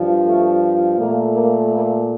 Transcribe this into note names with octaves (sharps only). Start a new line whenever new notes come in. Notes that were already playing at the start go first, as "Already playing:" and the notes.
Already playing: G2 F3
A3
A#2 A3 A#3
A#3
A#3